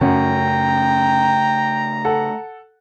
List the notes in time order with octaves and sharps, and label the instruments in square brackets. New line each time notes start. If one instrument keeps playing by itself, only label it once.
[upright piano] F#2 C#4 F#5 [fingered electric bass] C#3 A3 [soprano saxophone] G5 [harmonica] A#5
[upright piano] A4 F#5